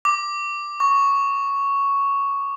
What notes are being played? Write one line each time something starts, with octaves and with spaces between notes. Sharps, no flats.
D6
C#6